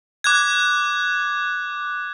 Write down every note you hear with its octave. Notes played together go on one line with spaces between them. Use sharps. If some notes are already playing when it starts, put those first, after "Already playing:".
D6 F#6 G#6